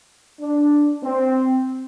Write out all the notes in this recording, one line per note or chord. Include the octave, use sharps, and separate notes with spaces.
D4
C4